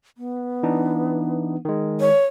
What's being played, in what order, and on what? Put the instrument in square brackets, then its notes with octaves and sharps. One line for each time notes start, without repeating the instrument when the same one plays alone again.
[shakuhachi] B3
[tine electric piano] E3 D4 D#4
D#3 G#3
[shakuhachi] C#5